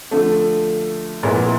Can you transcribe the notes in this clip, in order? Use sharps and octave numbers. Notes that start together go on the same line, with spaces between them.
D3 F3 A3
A#2 F3 G#3 B3 E4